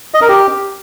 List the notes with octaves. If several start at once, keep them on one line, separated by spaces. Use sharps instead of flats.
D#5
A#4
G4